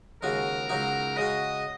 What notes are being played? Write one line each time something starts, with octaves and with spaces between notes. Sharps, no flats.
D#2 C#3 G#3 F#4 A#4
C#2 C#3 F#3 D#4 F#4
C#3 G#3 F#4 D#5